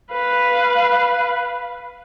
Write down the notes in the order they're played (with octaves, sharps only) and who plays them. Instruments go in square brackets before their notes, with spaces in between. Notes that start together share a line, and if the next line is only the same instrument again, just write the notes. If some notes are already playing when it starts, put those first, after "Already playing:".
[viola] B4 F5